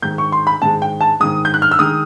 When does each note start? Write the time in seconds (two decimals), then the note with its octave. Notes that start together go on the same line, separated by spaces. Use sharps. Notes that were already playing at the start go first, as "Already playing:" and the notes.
0.02 G#2 D#3 G#3 G6
0.18 C#6
0.32 C6
0.47 B5
0.62 G#2 D#3 G#3 A5
0.82 G5
1.01 A5
1.20 G#2 D#3 G#3 D#6
1.45 G6
1.54 F#6
1.62 F6
1.71 E6
1.79 D#3 G#3 D#6